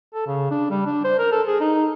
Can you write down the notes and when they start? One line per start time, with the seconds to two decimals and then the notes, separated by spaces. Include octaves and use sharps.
0.14 A4
0.27 C#3
0.51 D4
0.70 G3
0.86 D4
1.04 C5
1.19 A#4
1.32 A4
1.47 G#4
1.61 D#4